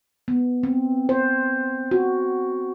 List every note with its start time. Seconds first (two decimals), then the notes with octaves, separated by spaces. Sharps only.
0.28 B3
0.63 C4
1.09 C5
1.91 F#4